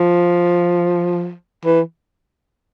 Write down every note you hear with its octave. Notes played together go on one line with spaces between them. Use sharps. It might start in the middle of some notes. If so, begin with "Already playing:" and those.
Already playing: F3
E3